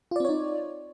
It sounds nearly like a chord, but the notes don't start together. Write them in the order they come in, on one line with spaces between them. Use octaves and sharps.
F4 D5 C4 C#5 D#4